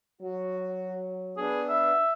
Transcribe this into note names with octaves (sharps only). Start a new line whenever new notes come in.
F#3 F#4
B3 D4 G#4
E5